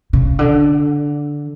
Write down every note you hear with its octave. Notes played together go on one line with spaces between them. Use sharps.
C#3
D3